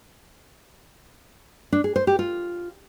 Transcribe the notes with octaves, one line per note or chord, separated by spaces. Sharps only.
D4
G#4
C5
G4
F4